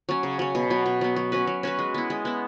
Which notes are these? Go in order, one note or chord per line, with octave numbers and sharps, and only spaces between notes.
F#3 C#4
C#3
F#3 C#4
B2
F#3 B3
B2
F#3 B3
F#3
C#4 F#4 B4
F#3
C#4 F#4 B4
G#3
B3 E4
G#3
B3 E4